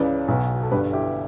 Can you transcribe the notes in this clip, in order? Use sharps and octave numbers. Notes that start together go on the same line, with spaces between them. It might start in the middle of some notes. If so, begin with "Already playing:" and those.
Already playing: C#2 C#3 E3 B4 D5
B1 B2
A4
G1 G2 D3 G4 B4
E4 G4